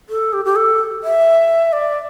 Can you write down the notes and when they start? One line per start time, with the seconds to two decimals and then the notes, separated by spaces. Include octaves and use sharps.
0.09 A4
0.33 G4
0.45 G4
0.56 A4
1.03 E5
1.73 D5